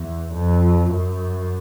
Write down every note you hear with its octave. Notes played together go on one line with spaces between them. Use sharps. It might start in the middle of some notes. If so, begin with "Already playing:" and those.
Already playing: E2
F2
F#2